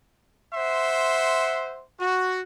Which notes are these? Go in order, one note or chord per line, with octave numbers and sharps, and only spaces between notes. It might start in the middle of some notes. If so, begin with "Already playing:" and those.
C5 E5 F#5 C6
F#4